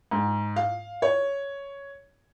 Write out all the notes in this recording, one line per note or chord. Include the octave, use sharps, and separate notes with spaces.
G#2
F5
C#5